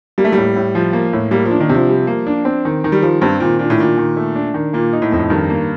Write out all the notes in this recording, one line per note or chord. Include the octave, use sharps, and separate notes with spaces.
G3 A#3
A3
A2 G3
A2
F3
A#3
A2
G3 A#3
F3
D4
D#3
C3 F3
G3
A#3
D4
C4
D#3
D#3
G3
F3 G3
G2 C4
A#2 D#3
A#2 D4
A2
A#2 D#3
D#3
A3
D4
D#3
A#2 A#3
D#4
A2
F2
A2
G2 D#3
A#3